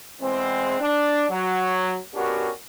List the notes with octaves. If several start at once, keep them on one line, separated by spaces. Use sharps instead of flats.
E2 G#3 C4
D4
F#3
B3 C#4 D4 F#4 G4 A#4